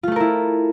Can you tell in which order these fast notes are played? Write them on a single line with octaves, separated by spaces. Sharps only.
F4 A3 A4 A#4 E4